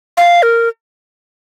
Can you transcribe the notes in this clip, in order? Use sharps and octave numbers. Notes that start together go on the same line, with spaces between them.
F5
A#4